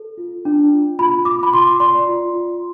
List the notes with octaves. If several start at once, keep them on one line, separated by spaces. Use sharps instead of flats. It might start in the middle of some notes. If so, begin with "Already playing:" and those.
Already playing: A4
F4
D4
F4
F4 B5
F4 D6
B5
F4 C6
D5 C6
F4
F4